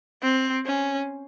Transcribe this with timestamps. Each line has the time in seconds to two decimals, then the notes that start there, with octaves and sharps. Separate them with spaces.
0.22 C4
0.66 C#4